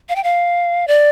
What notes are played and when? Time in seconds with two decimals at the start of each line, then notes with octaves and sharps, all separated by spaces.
0.09 F5
0.16 G5
0.24 F5
0.88 D5